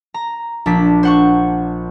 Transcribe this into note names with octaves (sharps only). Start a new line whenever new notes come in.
A#5
A#1 D4 B6
C5 F#5 C#6